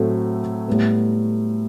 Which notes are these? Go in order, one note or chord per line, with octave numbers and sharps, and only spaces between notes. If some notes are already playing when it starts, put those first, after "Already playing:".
Already playing: A2 F#3 A3 C4
A2 G3 B3